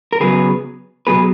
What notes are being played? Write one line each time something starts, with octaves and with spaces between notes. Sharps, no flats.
A#4
C#3 F#3 B3 G#4 B4
B2 F#3 B3 G#4 B4